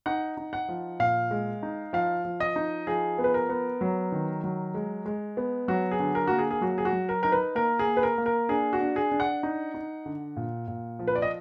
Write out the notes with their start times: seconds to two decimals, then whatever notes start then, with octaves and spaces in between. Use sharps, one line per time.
0.06 D#4 F#5
0.37 D#4
0.53 F#5
0.69 F3
0.99 A#2 F5
1.31 G#3
1.63 D#4
1.93 F3 F5
2.25 F3
2.40 D#5
2.56 D#4
2.87 F3 G#4
3.18 B3
3.24 B4
3.34 A#4
3.49 B3
3.81 F#3
4.12 D#3
4.44 F#3
4.74 G#3
5.06 G#3
5.37 B3
5.68 F#3 F#4
5.91 G#4
6.00 D3
6.15 A#4
6.28 A#3 F#4
6.39 G#4
6.51 G#4
6.61 F#3 F#4
6.78 G#4
6.85 F#4
6.93 F#3
7.09 A#4
7.23 D#4 A#4
7.32 B4
7.55 A#3 A#4
7.79 G#4
7.87 A#3
7.97 B4
8.03 A#4
8.18 A#3
8.26 A#4
8.49 D4 G#4
8.73 F#4
8.80 D4
8.96 G#4
9.12 D4
9.20 F#5
9.43 D#4
9.74 D#4
10.06 D3
10.36 A#2
10.68 A#2
10.99 F3
11.08 B4
11.15 D5
11.22 D#5